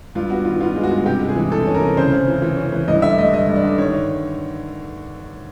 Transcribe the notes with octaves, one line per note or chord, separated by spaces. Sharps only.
G2 F4
B3 F#4
D#3 F4
B3 F4
G#3
F#4
G2
C3 G4
G#3
G#4
E3
C3 A4
C#4
A#4
C3
C#3 C5
C#3
E3
E3
C#4
E3
G2 D#5
D3 E5
A3 D#5
G2 D#5
G2
D5
D3
D#3 C#5